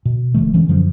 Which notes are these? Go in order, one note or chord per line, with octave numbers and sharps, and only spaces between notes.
B2
E1 D#3 F3 A3
E3 G#3 C#4
F#2 D3 F3 F#3